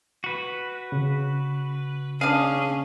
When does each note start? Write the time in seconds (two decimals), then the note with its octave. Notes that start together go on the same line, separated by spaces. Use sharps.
0.24 F#4 B4
0.92 C#3
2.21 C#4 D4 G#4 F5